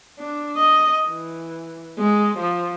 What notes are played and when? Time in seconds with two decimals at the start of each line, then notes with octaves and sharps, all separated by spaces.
0.19 D4
0.56 D#5
1.08 E3
1.99 G#3
2.38 F3